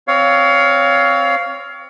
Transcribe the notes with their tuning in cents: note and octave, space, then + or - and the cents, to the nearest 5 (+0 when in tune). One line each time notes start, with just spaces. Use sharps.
C4 +0 C#5 +25 F5 +0